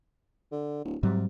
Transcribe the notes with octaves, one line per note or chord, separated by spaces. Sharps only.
D3
D1
G#2 C3 F#3 G3